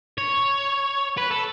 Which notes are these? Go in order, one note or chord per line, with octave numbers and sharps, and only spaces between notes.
C#5
B4
A4